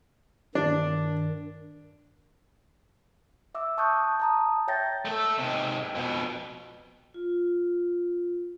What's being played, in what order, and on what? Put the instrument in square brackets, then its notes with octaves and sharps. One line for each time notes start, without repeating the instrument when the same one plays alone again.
[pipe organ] G2 D#3 [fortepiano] D4
[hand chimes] E5 D6 E6
A5 C#6 D#6 F#6 G6
A5 A#5 D#6
C#5 E5 G5 G6 A6 A#6
[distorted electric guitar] A3 A4
G#2 C3
F2 B2
[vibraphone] F4